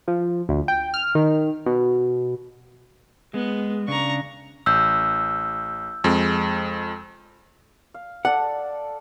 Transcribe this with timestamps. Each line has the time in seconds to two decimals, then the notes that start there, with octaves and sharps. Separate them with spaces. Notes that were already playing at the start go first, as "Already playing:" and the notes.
0.08 F3
0.49 D2
0.68 G5
0.94 F6
1.15 D#3
1.66 B2
3.34 G#3 B3
3.88 C#3 D4 A#5 C#6
4.66 A1 E6 G6
6.04 F2 G#3
7.94 F5
8.25 A4 D5 F#5